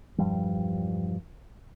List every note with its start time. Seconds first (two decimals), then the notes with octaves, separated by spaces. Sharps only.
0.18 E1 G2 F3 G3